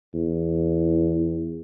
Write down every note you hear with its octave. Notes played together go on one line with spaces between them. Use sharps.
E2